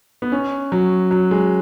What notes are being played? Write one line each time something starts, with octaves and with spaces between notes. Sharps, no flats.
B3
C#4
F#3
F#3
G#3